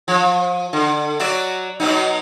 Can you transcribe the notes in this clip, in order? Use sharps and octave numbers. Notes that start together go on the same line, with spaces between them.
F3
D3
F#3 F#4 D5
B2 F#3 D#4